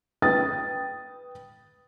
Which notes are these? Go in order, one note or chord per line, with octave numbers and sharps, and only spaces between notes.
B4 G5 D#6 A6